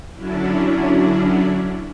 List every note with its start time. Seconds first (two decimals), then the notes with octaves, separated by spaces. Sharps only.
0.15 D3 F#3 C#4 D4 E4